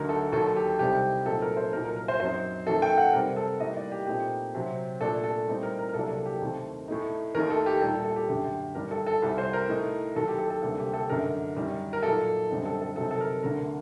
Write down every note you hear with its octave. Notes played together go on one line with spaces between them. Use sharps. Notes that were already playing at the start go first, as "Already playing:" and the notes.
Already playing: D2 D3 F#3 A3 D#4 A#4
A4
D#2 D#3 F#3 A4
G4
C2 C3 G3 C4 D#4 G4
A#2 F#3 A3 C4 D#4 A4
A#4
C5
C2 A#2 F#3 A#3 D#4 A#4
A#4
A#4
C5
F#2 F#3 C4 D#4 C5
F#2 D#3 F#3 A#3 A4
G5
F#5
C3 G3 C4 A#4
A4
A2 G3 A#3 D#4 D#5
D5
G4
A#2 A3 C4 D#4 G4
C3 F#3 C4
A#2 A3 D4 A4
A4
A2 G3 C4 D#4
A#4
A#4
A#4
C2 C3 F#3 A#3 D4 A4
G4
D#2 D#3 A3 C4
A2 A3 D#4
D#2 D#3 A3 D#4 A#4
A4
G4
A#2 G3 D4 A4
A4
A4
G4
F#2 D3 A3 G4
G2 D#3 G3 D4 A#4
A4
A4
C2 C3 G3
C5
A#4
A2 A3 D#4
D#2 D#3 F#3 A4
G4
A4
A4
D2 C3 G3 A#3 A4
G4
A4
F#2 D3 A3 D#4 A#4
F#2 D#3 G3
A#4
A#2 F#3 A#3 D#4 A4
F#2 D3 G3 C4 D#4
A4
A4
C3 F#3 C4 D#4 A4
A4
A#4
D2 D3 A3 A#4